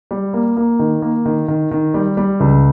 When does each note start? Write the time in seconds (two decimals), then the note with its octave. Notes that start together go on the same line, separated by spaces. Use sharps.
0.11 G3
0.34 A#3
0.57 A#3
0.79 D#3
1.02 A#3
1.25 D#3
1.48 D#3
1.71 D#3
1.94 G3
2.17 G3
2.40 C#2